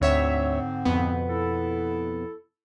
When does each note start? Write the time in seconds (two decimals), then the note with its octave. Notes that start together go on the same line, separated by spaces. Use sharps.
0.01 D2 G#2 D3 C4 C#5 E5
0.85 F2 B2 B3
1.30 E4 A4